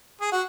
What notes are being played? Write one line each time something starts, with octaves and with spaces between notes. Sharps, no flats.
G#4
F#4